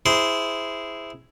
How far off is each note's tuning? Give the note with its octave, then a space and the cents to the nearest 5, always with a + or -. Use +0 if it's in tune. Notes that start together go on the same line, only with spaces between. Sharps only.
E4 +0 G#4 +0 C5 -15